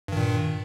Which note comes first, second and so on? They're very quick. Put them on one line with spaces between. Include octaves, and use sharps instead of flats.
G2 D#3 A#2